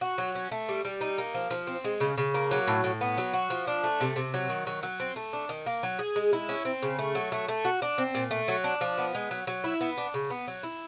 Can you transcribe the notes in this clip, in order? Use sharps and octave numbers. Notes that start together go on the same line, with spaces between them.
F#4
F#3
C#4
A3
G3
G3
D#4
A#3
F3
F3
C4
G#3
C#3
C#3
A#3
F#3
A2
A2
B3
F#3
F#4
F3
D4
A3
C3
C3
F#3
D#3
F#3
F#3
C4
A3
D4
D#3
A#3
F#3
G#4
G#3
E4
C#4
C4
C#3
A3
F#3
A3
A3
F#4
D4
C4
A#2
A3
F#3
D4
F3
B3
G#3
F#3
F#3
E4
B3
D4
C#3
B3
F#3
E4